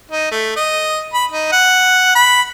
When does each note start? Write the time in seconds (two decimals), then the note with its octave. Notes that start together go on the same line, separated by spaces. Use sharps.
0.11 D#4
0.32 A3
0.56 D#5
1.14 B5
1.32 D#4
1.52 F#5
2.15 B5